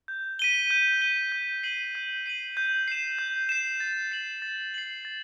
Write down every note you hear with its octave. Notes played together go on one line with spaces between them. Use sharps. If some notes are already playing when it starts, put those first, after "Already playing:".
G6
B6 D#7 G7
G6
B6 D#7 G7
G6
C7 D#7 F#7
G6
C7 D#7 F#7
G6
C7 E7
G6
C7 E7
A6
C7 F#7
A6
C7 F#7
A6